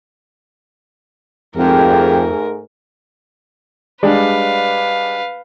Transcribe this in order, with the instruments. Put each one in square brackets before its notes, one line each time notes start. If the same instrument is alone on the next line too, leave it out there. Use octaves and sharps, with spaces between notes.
[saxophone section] F2 [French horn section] G#2 A3 G#4 [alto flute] G4 [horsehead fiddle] A#4
[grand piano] G3 G#3 D4 [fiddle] B4 F5